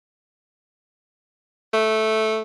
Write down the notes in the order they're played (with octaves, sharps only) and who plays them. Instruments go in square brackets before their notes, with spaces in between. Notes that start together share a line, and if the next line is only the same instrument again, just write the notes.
[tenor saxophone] A3